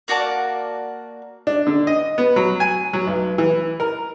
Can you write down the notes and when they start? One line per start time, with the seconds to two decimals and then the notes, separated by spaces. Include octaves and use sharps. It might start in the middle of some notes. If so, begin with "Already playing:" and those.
0.08 A#3 F#4 D5 A5
1.47 D4
1.67 D3
1.87 D#5
2.18 B3
2.36 F#3
2.60 G#5
2.93 F#3
3.07 B1
3.38 E3
3.80 A#4